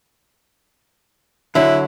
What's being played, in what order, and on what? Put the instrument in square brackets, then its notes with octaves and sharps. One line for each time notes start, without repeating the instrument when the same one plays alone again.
[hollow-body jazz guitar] D3 F#3 [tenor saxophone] E4